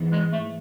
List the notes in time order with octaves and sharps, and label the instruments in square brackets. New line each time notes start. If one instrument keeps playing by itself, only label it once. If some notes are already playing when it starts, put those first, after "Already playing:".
Already playing: [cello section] G#2 E3 B3
[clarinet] G#3
A3